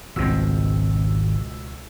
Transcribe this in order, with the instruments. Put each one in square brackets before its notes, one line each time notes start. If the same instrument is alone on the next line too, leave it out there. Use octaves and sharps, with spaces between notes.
[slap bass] G#1 G2 C4 [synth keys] C#2 B2 E6